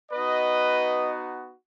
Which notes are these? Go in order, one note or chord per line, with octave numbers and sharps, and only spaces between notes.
B3 D#4 F#4 B4 D#5